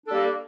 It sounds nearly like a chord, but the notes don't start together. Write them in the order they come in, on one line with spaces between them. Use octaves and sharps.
D4 A4 G3 A#3